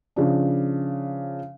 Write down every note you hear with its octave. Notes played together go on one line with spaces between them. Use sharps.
C#3 F3 D4